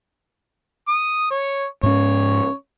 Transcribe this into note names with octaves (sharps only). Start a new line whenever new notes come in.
D#6
C#5
G#2 C#4 C#5